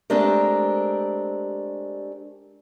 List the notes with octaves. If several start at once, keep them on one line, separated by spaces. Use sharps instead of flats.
G#3 A3 C4 D4 G4 A#4